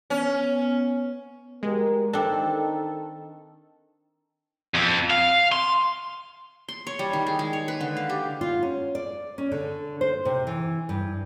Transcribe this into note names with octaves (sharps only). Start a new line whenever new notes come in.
B3 C#4
D2 G#3 G4 A#4
D#3 C4 D4 A4
F2
F5
C6
C6
C#5
G3
D#3
G#4
G#3
C#5
B4
D3
F5
G4
F4
C#4
D5
C#4
D3
C5
C3
E3
G2